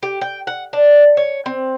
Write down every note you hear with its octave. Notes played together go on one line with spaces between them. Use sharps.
G4
G5
F#5
D4
C#5
C4